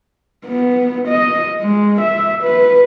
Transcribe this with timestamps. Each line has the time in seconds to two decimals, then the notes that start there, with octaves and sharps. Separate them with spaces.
0.46 B3
1.07 D#5
1.60 G#3
2.01 E5
2.43 B4